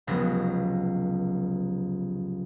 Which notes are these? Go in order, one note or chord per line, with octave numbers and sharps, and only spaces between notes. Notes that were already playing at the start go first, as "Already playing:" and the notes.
F1 C#2 F#3 B3 A#6